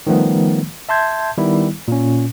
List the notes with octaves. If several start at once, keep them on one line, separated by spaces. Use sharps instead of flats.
D#3 F3 G3 A3 B3
E5 A5 C6 G6 G#6
D#3 G3 B3 E4
A#2 C#4